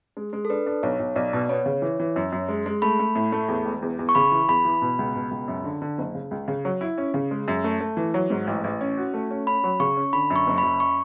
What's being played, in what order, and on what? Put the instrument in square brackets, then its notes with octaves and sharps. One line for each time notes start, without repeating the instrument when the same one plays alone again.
[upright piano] G#3
G#3
[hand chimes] A4
[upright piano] D4 [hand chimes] B4
[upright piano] D4
[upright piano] B1 [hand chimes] C#5
[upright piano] B1
[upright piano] B1 [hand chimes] D5
[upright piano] B2
[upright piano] B3 [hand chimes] C#5
[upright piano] C#3
E3
E3
F#2
F#2
G#3
G#3
[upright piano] A3 [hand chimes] B5
[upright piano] A3
A2
A3
E2
E1
E2
E2
[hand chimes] C#6
[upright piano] C#3 [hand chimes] B5
[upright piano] E3
[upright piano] E2 [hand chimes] B5
[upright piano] E3
B2
C#2
B2
C#2
F#2
D3
D3
F#1
C#3
C#2
C#3
F#3
E4
C#4
C#3
G#3
F#2
A3
A3
E3
F#3
G#2
A1
A1
C#4
F#4
A3
C#4
[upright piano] C#4 [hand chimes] B5
[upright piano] F#3
[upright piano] C#3 [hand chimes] C#6
[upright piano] C#4
[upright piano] D3 [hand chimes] B5
[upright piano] F#2
[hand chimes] C#6
[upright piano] F#1
[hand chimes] B5
[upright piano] F#2
[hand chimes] C#6